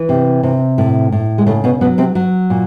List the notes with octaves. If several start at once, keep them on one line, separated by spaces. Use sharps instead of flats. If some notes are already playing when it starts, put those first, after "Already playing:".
Already playing: E3
C3
C3
A2
A2
G#3
C#3 A3
B2 B3
B2 F#3 B3
C3 C4
F#3
A#2